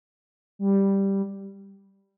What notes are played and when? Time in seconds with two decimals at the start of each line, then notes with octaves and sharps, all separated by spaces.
0.59 G3